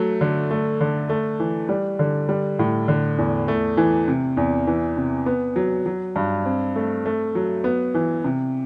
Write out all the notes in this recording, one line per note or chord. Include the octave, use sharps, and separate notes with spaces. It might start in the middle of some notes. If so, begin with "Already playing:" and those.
Already playing: F#3 A3
D3
A3
D3
A3
E3
G3
D3
G3
A2
D3
E2
A3
E3
C3
E2
E3
C3
B3
F#3
F#3
G2
C4
A3
A3
F#3
B3
E3
C3